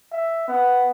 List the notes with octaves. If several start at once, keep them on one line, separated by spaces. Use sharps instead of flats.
E5
B3